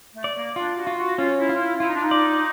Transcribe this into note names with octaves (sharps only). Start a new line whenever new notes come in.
A3
D5
A#3
D4 F4
F#4
F4
F#4
C#4 F4
E4
F4
E4
E4 F4
D#4
D4
D#4
D5